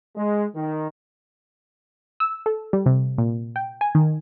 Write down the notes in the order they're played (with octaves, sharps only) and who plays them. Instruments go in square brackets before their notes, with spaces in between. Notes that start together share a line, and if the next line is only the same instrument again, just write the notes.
[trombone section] G#3
D#3
[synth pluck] E6
A4
G3
C3
A#2
G5
G#5
D#3